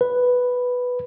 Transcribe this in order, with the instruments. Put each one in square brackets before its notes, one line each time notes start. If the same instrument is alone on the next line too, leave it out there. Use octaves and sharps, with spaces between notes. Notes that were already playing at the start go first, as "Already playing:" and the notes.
[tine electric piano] B4